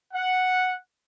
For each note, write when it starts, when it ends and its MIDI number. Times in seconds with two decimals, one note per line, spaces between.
0.13 0.72 78